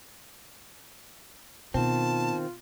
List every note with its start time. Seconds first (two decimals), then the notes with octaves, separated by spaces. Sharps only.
1.74 B2 D#3 C4 F4 A5